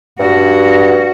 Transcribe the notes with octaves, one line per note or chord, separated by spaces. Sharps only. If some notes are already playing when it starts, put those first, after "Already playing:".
G2 F#4